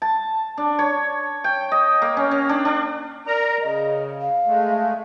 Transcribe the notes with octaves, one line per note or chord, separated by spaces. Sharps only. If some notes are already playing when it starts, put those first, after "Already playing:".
A5
D4
C#5
G5
D#5
A#3
C#4
C#4
D4
D4
A#4 D5 A#5
C#3 D#5
F5
G#3 A3